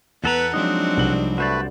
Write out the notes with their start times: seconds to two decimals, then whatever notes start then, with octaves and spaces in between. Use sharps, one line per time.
0.24 E2 B3 A4 B4 F#5 A#5
0.53 F3 F#3 G#3 C4 D4 D#4
0.97 C2 F#7
1.38 A3 F#4 B4 C5 D5